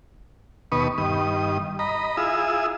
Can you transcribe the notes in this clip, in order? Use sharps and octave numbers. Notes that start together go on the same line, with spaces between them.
D#2 B2 B4 C#6 D#6
G2 D#3 D#6
D#5 A#5 B5
E4 F4 G#4 D#6 E6